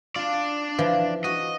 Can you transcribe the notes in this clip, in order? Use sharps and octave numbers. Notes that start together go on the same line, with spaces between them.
D4 F4 D5
E3 F3
F#4 D#5